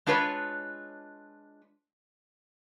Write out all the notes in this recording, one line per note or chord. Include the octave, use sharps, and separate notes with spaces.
G#3 D4 F4 B4 C#5